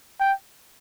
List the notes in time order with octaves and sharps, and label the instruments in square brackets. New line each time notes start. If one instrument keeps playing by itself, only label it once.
[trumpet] G5